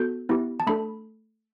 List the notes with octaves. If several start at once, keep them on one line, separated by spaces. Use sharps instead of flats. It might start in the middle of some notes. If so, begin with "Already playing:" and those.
Already playing: B3 F#4 A4 G6
B3 E4 G4
A5
A3 D4 A4 B5